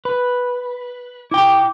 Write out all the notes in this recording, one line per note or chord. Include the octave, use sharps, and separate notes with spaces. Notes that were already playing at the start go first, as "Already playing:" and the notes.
B4
E4 G5 D6